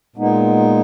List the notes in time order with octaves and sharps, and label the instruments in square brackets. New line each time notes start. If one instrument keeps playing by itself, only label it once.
[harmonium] A#2 G#3 B3 D#4